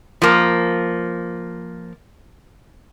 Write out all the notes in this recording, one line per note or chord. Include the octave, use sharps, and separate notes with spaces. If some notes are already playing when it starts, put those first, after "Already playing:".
F3 A#3